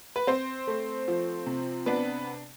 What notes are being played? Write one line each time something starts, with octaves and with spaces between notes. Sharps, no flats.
B4
C4 C5
A3
F3
C3
B3 D4 B4